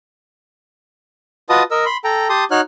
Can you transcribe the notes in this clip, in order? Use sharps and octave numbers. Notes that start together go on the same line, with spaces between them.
F4 F#4 B4 D#5 A5 D#6
A#4 D#5 E6
B5 C6
A4 G5 A#5
G4 A5 C6 D#6
D#4 F#4 C#5 F6 F#6